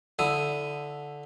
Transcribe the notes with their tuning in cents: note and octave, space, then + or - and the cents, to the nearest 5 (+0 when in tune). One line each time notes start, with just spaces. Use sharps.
D3 -10 E4 +5 D#6 +0